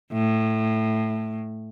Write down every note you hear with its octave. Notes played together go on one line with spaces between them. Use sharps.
A2